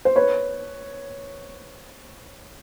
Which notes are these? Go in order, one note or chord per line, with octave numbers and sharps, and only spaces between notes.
C5
B4 C#5